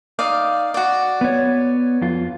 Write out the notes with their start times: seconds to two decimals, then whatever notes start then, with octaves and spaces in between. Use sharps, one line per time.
0.19 D#4 D5 F5
0.74 F#4 D5
1.21 B3 C#5
2.01 F2 F4